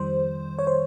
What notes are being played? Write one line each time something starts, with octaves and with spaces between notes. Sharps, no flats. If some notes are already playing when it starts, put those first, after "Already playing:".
Already playing: F2 D#3 G3 C5
C#5
C5